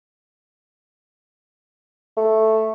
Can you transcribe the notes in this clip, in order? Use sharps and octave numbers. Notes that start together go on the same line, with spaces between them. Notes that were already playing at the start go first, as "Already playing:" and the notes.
A3